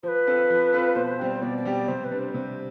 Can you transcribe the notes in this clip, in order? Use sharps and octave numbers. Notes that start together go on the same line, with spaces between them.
F3 B4 C5
C4 F4 A4
F3
C4 F4 A4
B2 C5
G3 C4 G4
B2 D5
D5
G3 C4 G4
D5
C3 C5
B4
G3 D4
C5
C3 C5